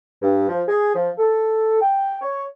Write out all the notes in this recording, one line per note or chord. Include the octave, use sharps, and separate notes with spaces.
G2
F3
G#4
F3
A4
G5
C#5